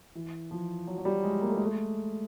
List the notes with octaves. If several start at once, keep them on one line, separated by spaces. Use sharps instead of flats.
E3
F3
F#3
F#3
G3
G#3
A#3
A3
G#3
A3